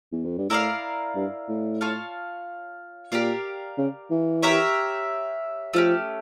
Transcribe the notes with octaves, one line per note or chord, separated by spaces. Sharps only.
E2
F2
G2
A2 E4 A#4 D5 F5
G2
A2
F4 C#5 F5 A5
A#2 G4 A#4 D5 F5
C#3
E3
G4 A#4 C#5 E5
F3 A3 C#4 G4